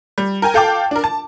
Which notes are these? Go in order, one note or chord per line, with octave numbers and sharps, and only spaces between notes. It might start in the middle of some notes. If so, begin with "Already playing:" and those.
G3
A#4 G5 G#5 A#5
A4 F5 G5 A5 D6
D4 A#4
A5